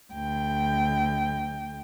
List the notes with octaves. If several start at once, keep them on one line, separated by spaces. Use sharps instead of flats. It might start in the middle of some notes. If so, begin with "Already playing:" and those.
D2 G5